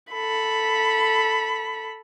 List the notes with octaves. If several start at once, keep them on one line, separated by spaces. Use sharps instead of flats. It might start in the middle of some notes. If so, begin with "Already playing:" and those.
A4 B5